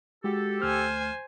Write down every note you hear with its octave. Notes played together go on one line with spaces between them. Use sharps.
G#3 F#4 G4 A4
D2 A3 C5 G#5 F6